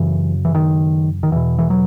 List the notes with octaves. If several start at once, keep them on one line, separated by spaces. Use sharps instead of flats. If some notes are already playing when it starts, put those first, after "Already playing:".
Already playing: F#2 C#3 E3
E3
D#3
D#3
E2 B2 E3
E3
F#3